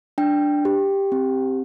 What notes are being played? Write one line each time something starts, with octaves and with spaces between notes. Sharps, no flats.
D4 G5
G4
C4